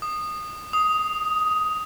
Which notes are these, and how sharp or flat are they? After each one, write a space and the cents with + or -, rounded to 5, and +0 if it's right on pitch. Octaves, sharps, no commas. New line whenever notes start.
D#6 -20
D#6 +10